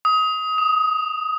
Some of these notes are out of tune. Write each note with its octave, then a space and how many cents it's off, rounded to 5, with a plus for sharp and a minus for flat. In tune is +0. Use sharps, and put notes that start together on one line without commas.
D#6 +25
D#6 -10